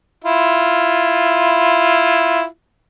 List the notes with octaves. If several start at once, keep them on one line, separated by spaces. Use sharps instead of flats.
E4 F4